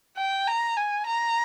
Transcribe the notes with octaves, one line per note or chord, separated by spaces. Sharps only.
G5
A#5
G#5
A#5